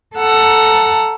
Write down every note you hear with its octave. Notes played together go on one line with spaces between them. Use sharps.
A4 F#5 A#5 E6